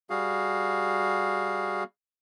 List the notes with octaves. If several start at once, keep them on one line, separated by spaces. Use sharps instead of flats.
G3 F#4 G#4 F5